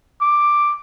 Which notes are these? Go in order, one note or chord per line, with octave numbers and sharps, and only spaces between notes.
D6